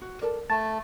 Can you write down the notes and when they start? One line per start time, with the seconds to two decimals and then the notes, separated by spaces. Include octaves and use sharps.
0.02 F#4
0.21 A4 A#4 D5
0.50 A3 A5 A6